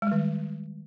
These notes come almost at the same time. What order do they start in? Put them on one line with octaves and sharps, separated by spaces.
G#3 G3 D#3